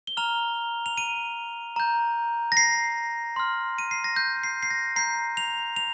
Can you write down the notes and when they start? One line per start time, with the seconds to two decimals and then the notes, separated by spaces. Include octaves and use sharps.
0.07 G7
0.17 A#5 F6 F7
0.86 F7
0.97 D#7
1.76 A#5 G6
2.52 A#6
2.57 C7
3.36 C6 F6
3.78 D#7
3.91 C7
4.04 A#6
4.16 G6
4.43 C7
4.63 C7
4.71 A#6
4.96 A#5 G6 C7
5.37 F7
5.76 F7